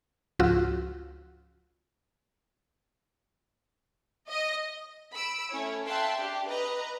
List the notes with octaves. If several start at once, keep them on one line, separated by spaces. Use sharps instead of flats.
C#2 G#2 F3 F4 F#4 E6
D#5
B5 E6 D7
A3 C#4 E4 C#5
E5 F5 G5 A5 C6 F#6
D4 G4
B4 D#5 A#5